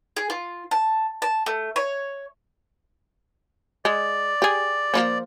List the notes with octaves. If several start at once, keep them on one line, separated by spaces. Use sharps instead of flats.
G#4
F4
A5
A5
A3
C#5
G#3 D5
G4 G#4
F3 A#3 C#4